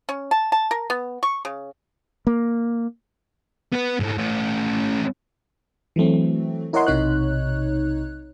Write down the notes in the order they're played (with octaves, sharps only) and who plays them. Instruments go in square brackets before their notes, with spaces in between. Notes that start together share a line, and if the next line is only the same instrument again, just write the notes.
[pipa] C#4
A5
A5
A#4
B3
C#6
C#3
[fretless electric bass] A#3
[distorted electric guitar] B3 B4
G#2 A3
A3 C#4
[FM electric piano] E3 F#3 A3 C4
E4 A#4 C#5 D#5 F#5 C6
B1 C3 D#4 C#5 F#6